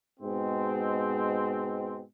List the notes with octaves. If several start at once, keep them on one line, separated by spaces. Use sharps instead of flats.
G#2 B2 G#3 C4